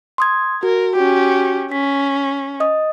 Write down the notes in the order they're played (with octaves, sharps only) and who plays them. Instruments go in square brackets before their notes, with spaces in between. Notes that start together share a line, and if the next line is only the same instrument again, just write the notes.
[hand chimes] C6 D#6 G#6
[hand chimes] F#4 [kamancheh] A#4
[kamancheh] C#4 G4 [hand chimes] F#4
[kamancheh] C#4 [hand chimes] B6
[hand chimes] D#5 D#6